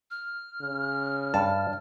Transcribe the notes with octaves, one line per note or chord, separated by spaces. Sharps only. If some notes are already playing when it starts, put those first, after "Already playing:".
F6
C#3
G2 A5